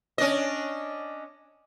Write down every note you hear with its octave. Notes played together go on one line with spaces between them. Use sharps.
C#4 D4 D#5